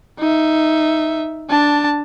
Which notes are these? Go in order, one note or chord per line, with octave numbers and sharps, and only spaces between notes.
D#4 E5
D4 A5